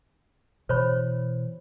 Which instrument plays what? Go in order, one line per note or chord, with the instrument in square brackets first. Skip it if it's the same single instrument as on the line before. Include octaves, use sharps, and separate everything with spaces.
[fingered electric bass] B2 E3 [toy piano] C5 C#5 B5